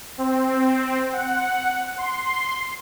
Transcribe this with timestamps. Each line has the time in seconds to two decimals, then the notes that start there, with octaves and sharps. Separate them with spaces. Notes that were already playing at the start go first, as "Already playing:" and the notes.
0.18 C4
1.13 F#5
1.98 C6